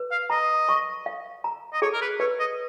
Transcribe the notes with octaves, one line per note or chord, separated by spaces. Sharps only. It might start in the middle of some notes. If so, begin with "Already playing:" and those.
Already playing: B4
F5
D#5 A#5
C#6
F5
A#5
D#5
G#4 C#5
A#4
B4
B4 C#5
D#5